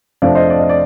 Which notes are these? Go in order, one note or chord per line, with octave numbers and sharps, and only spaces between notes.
F2 C3 F3 A3 D4 D5 F5
C5 D#5
D5
D#5
D5